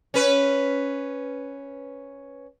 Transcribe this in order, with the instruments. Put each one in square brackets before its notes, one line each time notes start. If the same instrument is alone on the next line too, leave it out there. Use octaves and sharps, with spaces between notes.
[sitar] C#4 B4